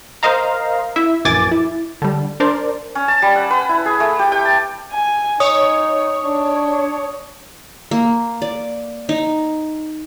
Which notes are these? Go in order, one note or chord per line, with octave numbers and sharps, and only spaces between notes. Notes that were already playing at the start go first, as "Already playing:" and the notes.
A#4 C5 D#5 F5 A#5
E4 E5
A#1 F#2 E3 G#5 D6 A6
E4
D3 G3
D4 A#4 C5 D5
C#4
A5
G3
F#5
B4
E4
G#4
A3
G4
G5
A5
G#5
D#4 C#5 D#6
D4
A#3
D5
D#4